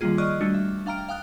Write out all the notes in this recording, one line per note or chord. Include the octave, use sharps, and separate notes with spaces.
D#3 F3 G3 A#3 F4 G#4
D5 D#5 C#6 D#6 F6 F#6
G3 A3 D4 F#4
E5
D4 F5 G5 A#5 F6 D7
F5 G5 D#6 F#6